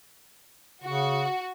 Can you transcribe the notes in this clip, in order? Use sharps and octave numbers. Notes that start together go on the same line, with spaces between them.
C#3 F#4